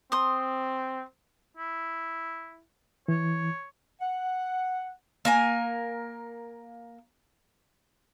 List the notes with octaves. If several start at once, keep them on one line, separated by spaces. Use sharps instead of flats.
C4 C6 D#6
E4
E3 C#5
F#5
A#3 A#4 G#5